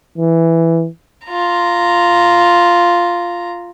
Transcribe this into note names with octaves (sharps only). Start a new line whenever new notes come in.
E3
F4 A#5